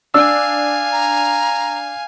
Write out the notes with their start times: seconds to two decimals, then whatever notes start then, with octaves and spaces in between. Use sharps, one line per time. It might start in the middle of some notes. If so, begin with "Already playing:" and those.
0.14 D4 F5 G#5 E6
0.92 A#5